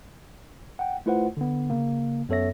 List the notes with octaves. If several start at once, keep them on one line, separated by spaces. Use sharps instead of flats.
F#5 G5
A3 E4 F4 B4 C5 F#5
D3 B3
C#3 A#3
F#2 B3 A4 C#5 E5 A#6